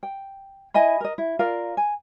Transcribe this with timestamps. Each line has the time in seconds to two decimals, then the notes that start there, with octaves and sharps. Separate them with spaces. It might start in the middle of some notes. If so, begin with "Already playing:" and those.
0.03 G5
0.74 E4 D#5 G#5 B5
1.01 A#4 D#5
1.18 E4
1.39 F4 A#4 D5 F5
1.77 G#5